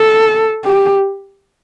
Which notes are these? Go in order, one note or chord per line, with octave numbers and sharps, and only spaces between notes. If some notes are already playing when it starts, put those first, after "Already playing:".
Already playing: A4
G4